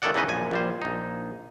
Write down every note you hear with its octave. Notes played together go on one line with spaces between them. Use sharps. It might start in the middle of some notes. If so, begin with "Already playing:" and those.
F#2 D#3 A#3 A4 D5 F#5
E2 C#3 E3 D#4 B4 D#5
A#1 F#2 G#5
A#1 G3 C5
A#1 D#4